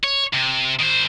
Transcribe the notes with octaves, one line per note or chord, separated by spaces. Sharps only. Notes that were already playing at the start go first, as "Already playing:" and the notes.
C#5
C3
D#3 C5